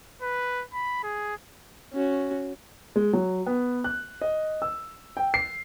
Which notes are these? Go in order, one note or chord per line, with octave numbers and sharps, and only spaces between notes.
B4
B5
G#4
C#4 F#4
G#3
F#3
B3
F#6
D#5
E6
G5
C7